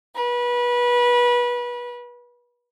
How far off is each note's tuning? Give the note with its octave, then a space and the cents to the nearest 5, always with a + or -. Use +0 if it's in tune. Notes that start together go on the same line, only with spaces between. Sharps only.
B4 -25